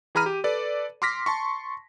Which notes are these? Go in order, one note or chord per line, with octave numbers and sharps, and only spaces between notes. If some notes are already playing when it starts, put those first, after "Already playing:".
E3 G#4 A#5 B5 F6 D#7
G4
A4 B4 D5
C6 D6 F6 A#6 B6
A5 C6 C#6